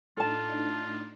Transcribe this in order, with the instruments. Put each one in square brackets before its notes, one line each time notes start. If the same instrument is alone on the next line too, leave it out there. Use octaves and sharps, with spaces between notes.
[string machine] A2 D4 D#4 [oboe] F4 [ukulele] A4 A5